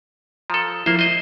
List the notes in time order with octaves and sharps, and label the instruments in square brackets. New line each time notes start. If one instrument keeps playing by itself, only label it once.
[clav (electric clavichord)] F3 A4 [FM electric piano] A#5 D#6
[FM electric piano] F3 E4 [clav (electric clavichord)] A#3 C5
[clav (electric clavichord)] C5 D#5